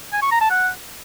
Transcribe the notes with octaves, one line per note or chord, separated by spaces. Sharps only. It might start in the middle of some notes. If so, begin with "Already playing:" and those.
G#5
C#6
A#5
A5
F#5